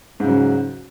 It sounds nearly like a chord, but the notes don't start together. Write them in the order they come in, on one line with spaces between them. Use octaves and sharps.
G#2 C#3 F#3